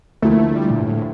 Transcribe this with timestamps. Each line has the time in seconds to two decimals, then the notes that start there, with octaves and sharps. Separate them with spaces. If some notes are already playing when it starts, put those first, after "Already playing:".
0.22 D2 D3 F3 A3 A#3 E4
0.55 G3
0.70 A#2
0.80 G2
0.86 A2